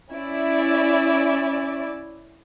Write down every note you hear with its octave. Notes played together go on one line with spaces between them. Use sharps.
C#4 E4 D5